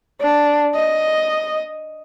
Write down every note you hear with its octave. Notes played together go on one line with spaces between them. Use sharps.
D4
D#5